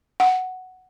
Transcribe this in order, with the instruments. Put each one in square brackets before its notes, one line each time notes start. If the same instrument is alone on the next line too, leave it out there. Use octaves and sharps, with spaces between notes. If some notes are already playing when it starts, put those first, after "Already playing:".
[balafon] F#5